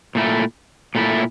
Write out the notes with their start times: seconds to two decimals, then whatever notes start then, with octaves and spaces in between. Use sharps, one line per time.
0.15 A#2 A3 E4
0.95 A#2 A3 E4